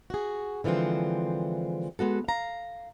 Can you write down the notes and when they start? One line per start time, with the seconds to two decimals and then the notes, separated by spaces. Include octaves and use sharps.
0.10 F#4 G#4
0.64 D3 E3 F3 G#3 C4
1.99 G#3 B3 F#4 A4
2.28 F5 A#5